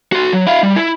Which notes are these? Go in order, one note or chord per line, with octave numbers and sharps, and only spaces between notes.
F#4 C6
F#3
E4 F5
G3
E4